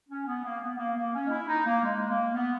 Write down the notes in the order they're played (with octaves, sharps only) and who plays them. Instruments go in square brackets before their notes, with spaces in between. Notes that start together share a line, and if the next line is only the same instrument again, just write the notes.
[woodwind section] C#4
B3
A#3
B3
A#3
A#3
C#4
D#4
E4
D#4
A#3
G#3
A#3
B3